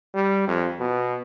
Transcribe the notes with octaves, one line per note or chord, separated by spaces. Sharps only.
G3
F2
B2